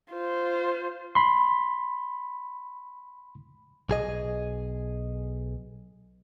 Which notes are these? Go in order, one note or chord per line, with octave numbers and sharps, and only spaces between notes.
F4 C5
B5 C6
B1 G#4 D#5